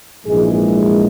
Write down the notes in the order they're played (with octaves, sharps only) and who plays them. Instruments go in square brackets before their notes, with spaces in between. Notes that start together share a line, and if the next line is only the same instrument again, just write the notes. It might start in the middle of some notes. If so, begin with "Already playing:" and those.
[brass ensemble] A#1 G#2 E3 G#3 G#4